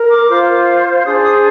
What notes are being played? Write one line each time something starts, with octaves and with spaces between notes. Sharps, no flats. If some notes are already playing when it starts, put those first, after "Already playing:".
Already playing: A#4
D6
F4 C5
D4 G#4 C5 D#6
D#6